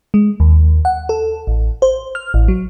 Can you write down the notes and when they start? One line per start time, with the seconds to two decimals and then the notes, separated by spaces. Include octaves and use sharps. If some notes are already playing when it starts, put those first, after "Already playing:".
0.14 G#3
0.40 D#2
0.85 F#5
1.09 A4
1.47 A1
1.82 C5
2.15 F6
2.34 A1
2.48 F#3